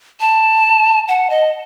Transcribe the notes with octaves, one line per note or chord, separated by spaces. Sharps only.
A5
F#5
D#5